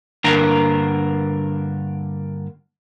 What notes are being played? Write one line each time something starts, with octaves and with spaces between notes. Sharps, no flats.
G2 D3 A#3 D4 A#4 A#5